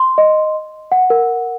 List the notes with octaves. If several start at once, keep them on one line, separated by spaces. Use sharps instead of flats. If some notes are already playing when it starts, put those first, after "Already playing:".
Already playing: C6
D#5
F#5
A#4